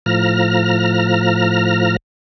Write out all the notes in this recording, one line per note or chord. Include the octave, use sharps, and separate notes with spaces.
A2 F3 A#5 F6